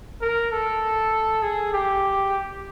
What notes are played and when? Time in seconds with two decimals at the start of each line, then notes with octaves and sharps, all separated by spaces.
0.22 A#4
0.52 A4
1.43 G#4
1.73 G4